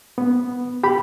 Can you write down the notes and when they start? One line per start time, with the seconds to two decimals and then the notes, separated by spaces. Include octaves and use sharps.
0.18 B3
0.83 G4 B5